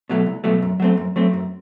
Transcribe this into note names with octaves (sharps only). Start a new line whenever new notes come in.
B2 F#3 A3
C2
B2 F#3 A3
F#2
F#3 A3 C4
F#2
F#3 A3 C4
F#2